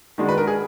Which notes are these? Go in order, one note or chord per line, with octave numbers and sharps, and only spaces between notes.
D#3 G#3 D4 F#4
B4
A#4
G#4